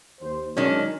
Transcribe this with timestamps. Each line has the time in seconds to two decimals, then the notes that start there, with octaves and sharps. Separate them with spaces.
0.21 D#2 C5
0.57 D#3 F#3 G#3 C#4 D4